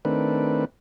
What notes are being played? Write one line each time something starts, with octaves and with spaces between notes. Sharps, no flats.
D#3 A3 C4 D4 B4